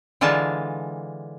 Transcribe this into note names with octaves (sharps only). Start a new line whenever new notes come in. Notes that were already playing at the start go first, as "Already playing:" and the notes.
D3 E3 G#3 F4 A5